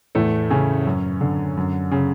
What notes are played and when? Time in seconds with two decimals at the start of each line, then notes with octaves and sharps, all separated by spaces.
0.15 E2 A2 A3
0.50 C#3 C#4
0.87 F#2
1.21 D3
1.57 F#2
1.91 C#3